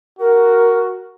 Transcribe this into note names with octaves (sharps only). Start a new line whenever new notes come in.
F#4 A#4